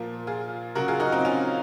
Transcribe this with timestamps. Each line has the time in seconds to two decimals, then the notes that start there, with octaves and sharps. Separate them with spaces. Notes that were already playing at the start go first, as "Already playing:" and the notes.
Already playing: A#2 F3 A#3
0.27 F4 G#4
0.75 C#3 F#3 F#4 A#4
0.88 F4 G#4
1.00 D#4 F#4
1.12 C4 D#4
1.25 C#4 F4